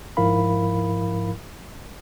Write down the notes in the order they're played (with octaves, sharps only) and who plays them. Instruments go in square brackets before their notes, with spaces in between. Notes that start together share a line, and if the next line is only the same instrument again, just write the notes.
[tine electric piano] G#2 F3 E4 A#4 F5 B5